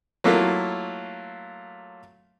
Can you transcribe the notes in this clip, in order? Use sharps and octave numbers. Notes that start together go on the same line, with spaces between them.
F#3 A3 A#3 E4 F4